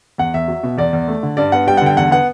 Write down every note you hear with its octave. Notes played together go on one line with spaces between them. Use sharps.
E2 F#5
E2 E5
F#3
B2
E2 D5
E2
A3
D3
G2 D5
B3 F#5
G3 G5
F#5
D3 G5
E2 F#5
B3 F#5